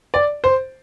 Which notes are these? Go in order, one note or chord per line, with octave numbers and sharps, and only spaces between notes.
D5
C5